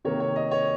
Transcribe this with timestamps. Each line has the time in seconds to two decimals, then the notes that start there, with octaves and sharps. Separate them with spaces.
0.05 C3 D#3 A#3 C#5
0.20 C#5
0.36 D#5
0.51 C#5